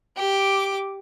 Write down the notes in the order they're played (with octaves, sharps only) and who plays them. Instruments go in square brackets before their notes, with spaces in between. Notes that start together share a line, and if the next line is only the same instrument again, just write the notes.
[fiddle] G4 D6